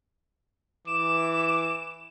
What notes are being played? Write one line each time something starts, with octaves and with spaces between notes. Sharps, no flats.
E3 D6 E7